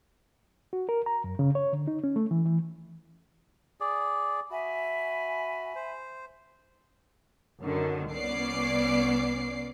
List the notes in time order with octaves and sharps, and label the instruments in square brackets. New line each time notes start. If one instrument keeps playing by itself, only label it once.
[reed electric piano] F#4
A#4
A#5
F#2
C#3
C#5
D3
D#4
C#4
A3
E3
E3
[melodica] G#4 D5
[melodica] F#4 [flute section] E5 G#5 B5
[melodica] C5
[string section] F#2 D3 D#3
C2 B3 C#4 D5 D6 C7